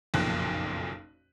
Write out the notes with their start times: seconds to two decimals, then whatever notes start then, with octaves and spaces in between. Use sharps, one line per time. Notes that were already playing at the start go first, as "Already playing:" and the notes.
0.14 F#1 B1 F2 A#2 G5 F#6